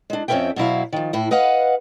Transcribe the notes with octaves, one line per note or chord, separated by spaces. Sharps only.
G#3 D4
F2 C4 C#4 B4 E5 G5
B2 F#3 E4 F5
D#3 F3
A2 E4
B4 D#5 F5 F#5